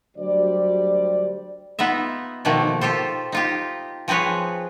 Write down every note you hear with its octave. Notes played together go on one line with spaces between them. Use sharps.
D2 F#3 G3 G4 C5 D5
B3 D#4 F4 E5
B2 D#3 F3 A3 A#3
F4 G4 A4 C5
D#4 F4 G4
F3 C4 G#4 B4 C#5